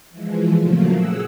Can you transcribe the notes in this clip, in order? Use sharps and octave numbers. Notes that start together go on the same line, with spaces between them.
E3 F3 G#3
A#2 C#3 F3 F#3 A3 A#3
G#4 F#5 E6